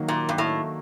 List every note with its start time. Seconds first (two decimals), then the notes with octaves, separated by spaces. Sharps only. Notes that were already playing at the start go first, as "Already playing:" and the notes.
Already playing: D#3 F#3 A#3 D#4 F#4
0.08 A#2
0.29 G2
0.38 A2